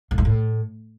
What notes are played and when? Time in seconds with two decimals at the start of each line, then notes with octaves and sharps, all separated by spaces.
0.11 A2
0.18 G#2
0.25 A2